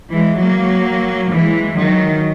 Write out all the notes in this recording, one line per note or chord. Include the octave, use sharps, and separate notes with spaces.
E3 G#3
F#3 A#3
E3 G#3
D#3 F#3